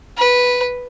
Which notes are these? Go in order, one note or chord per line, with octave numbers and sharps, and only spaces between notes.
B4